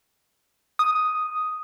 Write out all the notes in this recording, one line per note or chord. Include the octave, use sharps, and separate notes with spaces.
D#6